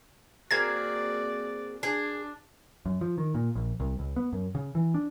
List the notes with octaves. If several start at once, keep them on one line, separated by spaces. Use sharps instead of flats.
A#3 C4 F#4 G#4 D5 G#6
D4 G#4
F#2
F3
D#3
A#2
A#1
C2
C#2
B3
F#2
C#3
E3
D4